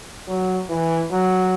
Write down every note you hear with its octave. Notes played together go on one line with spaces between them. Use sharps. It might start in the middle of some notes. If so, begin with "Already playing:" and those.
F#3
E3
F#3